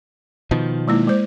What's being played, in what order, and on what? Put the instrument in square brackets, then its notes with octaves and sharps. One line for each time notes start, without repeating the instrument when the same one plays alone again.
[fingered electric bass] B2 D#3 F3
[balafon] G#3 A#3 E4
G#3 C5